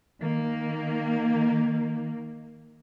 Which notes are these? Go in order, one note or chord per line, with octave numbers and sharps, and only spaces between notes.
D#3 A#3